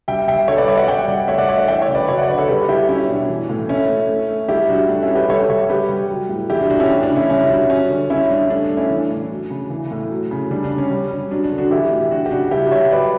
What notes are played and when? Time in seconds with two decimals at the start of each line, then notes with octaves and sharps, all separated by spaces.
0.08 G3 E5 G5
0.28 G3 E5 G5
0.48 G3 A4 C#5
0.58 B4 D5
0.68 G3 C#5 E5
0.77 D5 F#5
0.88 G3 E5 G5
1.08 G3 D5 F#5
1.28 A3 C#5 E5
1.38 D5 F#5
1.48 A3 C#5 E5
1.58 D5 F#5
1.68 E3 E5 G5
1.81 C#5 E5
1.88 C#3
1.95 B4 D5
2.08 F#3 C#5 E5
2.18 D5 F#5
2.29 D3 B4 D5
2.38 A4 C#5
2.48 G3 G4 B4
2.68 G3 E4 G4
2.89 F#3 C#4 E4
3.09 B2 D4
3.29 E3
3.49 A2
3.69 A3 C#4 E4
3.89 A3
4.09 A3
4.29 A3
4.49 G3 E4 G4
4.69 G3 D4 F#4
4.89 A3 D4
5.03 C#4 E4
5.10 A3
5.15 G4 B4
5.29 G3 A4 C#5
5.50 G3 C#5 E5
5.69 G3 G4 B4
5.89 G3
6.10 F#3
6.29 A2
6.50 E3 E4 G4
6.60 D4 F#4
6.70 A2 D4 F#4
6.80 C#4 E4
6.89 E3 D4
7.03 D4
7.10 C#3
7.16 C#4 E4
7.30 G3 C#4 E4
7.50 G3 D4 F#4
7.70 F#3 C#4
7.90 D3
8.10 G3 C#4 E4
8.30 G3 D4
8.50 A3 D4
8.64 D4
8.70 A3
8.77 C#4 E4
8.90 E3 D4
9.11 A2
9.31 F#3
9.50 C#3
9.70 E3
9.91 A2
10.10 F#3
10.31 C#3
10.51 G3 D4
10.64 D4
10.71 G3
10.78 C#4
10.91 G3
11.11 G3
11.31 F#3 D4
11.44 D4
11.51 D3
11.58 D4 F#4
11.71 E3 E4 G4
11.91 A2
12.11 F#3 D4 F#4
12.26 G4
12.31 C#3 D4 F#4
12.51 G3 E4 G4
12.71 G3 C#5 E5
12.91 F#3 B4 D5